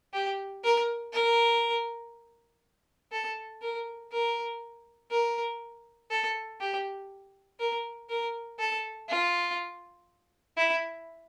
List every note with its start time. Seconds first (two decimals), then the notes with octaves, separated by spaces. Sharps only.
0.13 G4
0.64 A#4
1.13 A#4
3.12 A4
3.61 A#4
4.12 A#4
5.11 A#4
6.11 A4
6.60 G4
7.59 A#4
8.09 A#4
8.59 A4
9.09 F4
10.57 E4